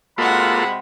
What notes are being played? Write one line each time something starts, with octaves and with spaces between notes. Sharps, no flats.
C3 G#3 A#3 F4 F#4 A4 F#5 B5